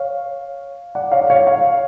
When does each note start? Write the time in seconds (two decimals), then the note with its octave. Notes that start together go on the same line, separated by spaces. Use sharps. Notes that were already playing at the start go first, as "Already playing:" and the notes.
Already playing: C#5 F5
0.95 D5 F#5
1.12 C#5 F5
1.21 D5
1.30 C#5 F5
1.46 C#5 F5